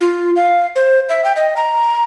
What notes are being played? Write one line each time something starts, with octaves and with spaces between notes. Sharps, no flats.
F4
F5
C5
E5
G5
D#5
A#5